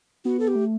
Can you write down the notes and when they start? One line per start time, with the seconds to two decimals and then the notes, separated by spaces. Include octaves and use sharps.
0.25 B3 F#4
0.40 A4
0.48 G4
0.55 A3